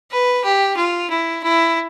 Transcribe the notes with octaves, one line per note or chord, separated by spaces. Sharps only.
B4
G4
F4
E4
E4